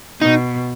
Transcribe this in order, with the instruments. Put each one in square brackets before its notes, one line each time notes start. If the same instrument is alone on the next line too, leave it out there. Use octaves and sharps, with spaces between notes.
[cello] B2 [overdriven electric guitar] D#4